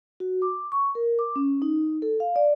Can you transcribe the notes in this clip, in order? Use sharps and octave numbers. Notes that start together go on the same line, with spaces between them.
F#4
D6
C#6
A#4
D6
C#4
D#4
A4
F5
D5